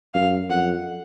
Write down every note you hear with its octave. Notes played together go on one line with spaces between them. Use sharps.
F#2 F5
F2 F#5